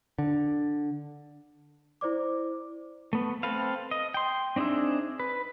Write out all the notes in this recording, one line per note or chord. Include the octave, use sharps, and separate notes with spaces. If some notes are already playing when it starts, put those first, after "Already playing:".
D3
E4 C5 D5 D6
A3 B3
C4 A4 B4 F5
D#5
G5 C6
C4 D4 D#4 G#4 E5
B4